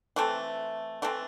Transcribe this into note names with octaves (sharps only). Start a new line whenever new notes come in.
E3 A3 C4
E3 A3 C4